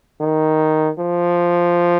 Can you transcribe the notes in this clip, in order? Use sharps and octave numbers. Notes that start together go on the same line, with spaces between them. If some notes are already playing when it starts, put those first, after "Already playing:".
D#3
F3